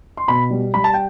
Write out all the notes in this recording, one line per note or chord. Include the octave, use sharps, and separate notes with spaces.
C6
B2 B5
G3
G3 B5
A5
G5